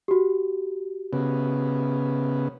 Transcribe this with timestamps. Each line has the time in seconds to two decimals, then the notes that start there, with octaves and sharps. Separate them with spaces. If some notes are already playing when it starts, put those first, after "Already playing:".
0.08 F#4 G4
1.13 C#3 B3